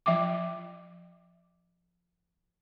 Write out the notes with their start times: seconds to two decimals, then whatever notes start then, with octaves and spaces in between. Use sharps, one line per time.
0.06 F3 E5 G5 D6